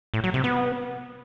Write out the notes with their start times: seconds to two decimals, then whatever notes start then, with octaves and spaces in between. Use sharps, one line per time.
0.14 A2
0.24 F#3
0.34 C3
0.44 B3